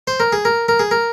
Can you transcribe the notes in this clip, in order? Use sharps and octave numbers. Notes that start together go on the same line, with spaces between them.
C5
A#4
G#4
A#4
A#4
G#4
A#4